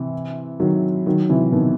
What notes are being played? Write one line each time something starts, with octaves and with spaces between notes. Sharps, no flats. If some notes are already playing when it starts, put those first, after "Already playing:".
Already playing: C3 E3
D#3 F#3
D#3 F#3
C3 E3
B2 D#3